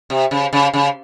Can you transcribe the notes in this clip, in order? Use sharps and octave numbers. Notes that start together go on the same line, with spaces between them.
C3
C#3
C#3
C#3